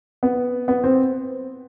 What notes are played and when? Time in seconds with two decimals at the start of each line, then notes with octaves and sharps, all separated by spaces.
0.23 B3
0.68 B3
0.84 C4